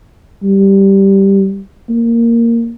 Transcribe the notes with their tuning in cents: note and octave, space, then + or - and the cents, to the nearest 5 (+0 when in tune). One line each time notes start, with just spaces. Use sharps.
G3 -5
A#3 -5